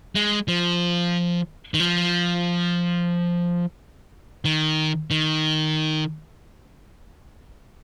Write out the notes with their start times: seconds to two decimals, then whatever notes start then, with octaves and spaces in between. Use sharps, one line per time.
0.15 G#3
0.48 F3
1.74 D#3
1.80 F3
4.45 D#3
5.11 D#3